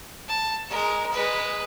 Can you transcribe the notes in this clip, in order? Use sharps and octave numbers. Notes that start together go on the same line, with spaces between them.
A5
G#3 A#4
G#3 B4